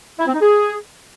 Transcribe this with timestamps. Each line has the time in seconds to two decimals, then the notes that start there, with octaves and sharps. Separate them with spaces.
0.19 E4
0.26 C4
0.33 D#4
0.41 G#4